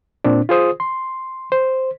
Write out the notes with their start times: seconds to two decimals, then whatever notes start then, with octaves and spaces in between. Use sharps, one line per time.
0.24 A#2 C4 D4
0.49 F4 G#4 C5 D#6
0.80 C6
1.52 C5